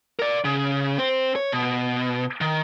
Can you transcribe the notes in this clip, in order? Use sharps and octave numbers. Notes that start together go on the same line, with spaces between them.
A#4 D5
C#3
C4 C5
C#5
B2
D#3